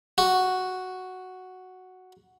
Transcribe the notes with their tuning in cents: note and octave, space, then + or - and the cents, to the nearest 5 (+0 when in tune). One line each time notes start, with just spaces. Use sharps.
F#4 +0